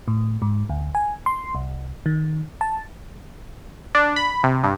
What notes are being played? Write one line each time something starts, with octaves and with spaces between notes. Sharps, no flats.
A2
G#2
D2
G#5
C6
C2
D#3
A5
D4
B5
C3
G2